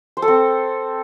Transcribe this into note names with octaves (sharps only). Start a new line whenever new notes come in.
C5
A4
C4